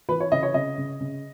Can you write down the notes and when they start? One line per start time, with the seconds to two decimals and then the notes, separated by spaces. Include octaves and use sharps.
0.08 E3 B4
0.20 C#5
0.32 C#3 D#5
0.43 C#5
0.54 C#3 D#5
0.78 C#3
1.01 C#3